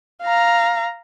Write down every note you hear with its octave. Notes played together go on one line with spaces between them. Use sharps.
F5 A#5